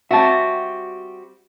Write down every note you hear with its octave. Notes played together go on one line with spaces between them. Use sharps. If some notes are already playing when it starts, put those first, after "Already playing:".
G3 C4 F#4 E5 A5